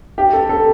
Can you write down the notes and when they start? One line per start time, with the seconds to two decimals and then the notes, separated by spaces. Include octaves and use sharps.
0.18 G4
0.33 A4
0.49 A4